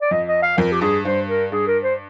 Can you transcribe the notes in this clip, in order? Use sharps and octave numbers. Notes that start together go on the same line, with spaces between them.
D5
F2 D#5
D#5
F5
F2 A#4
G4
G2 G#4
G2 C5
A#4
G2 G#4
A#4
C5